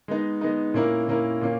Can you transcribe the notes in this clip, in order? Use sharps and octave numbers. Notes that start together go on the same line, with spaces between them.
G#3 B3 D#4
G#3 B3 D#4
A#2 A#3 C#4 E4 A#4
A#2 A#3 C#4 E4 A#4
A#2 A#3 C#4